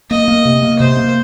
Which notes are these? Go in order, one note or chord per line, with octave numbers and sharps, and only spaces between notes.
A#3 D#5
A#3
C3
A#3
C3 C5
A#3